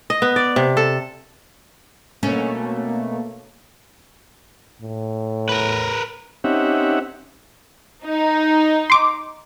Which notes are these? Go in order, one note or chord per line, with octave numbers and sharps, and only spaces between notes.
D#5
B3
D5
C3
A4
B2 A3 A#3 C#4
A2
A#4 B4
C4 C#4 D#4 G4 E5 F#5
D#4
C6 D6